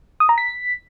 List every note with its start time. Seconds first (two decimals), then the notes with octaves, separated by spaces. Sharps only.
0.20 D#6
0.29 A#5
0.38 B6